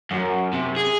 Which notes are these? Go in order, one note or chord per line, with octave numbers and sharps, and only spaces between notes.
F#2
C3
G#4